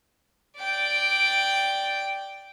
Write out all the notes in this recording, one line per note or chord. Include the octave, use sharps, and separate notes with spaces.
D5 G5